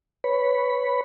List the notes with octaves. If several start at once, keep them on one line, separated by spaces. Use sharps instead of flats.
B4 C#5 B5